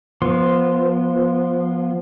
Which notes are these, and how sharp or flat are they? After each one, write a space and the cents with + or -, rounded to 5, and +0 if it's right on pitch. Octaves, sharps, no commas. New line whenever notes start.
F3 +0 B3 -20 C6 +0